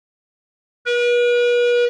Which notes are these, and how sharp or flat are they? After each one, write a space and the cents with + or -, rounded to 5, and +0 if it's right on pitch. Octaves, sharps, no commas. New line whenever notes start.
B4 -40